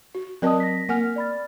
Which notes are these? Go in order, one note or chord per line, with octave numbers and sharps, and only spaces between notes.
F#4
F#3 C4 A#4 D5 D#5 A5 D#6
A#6 B6
A#3 F#5 G#5 F6
D5 B5 A6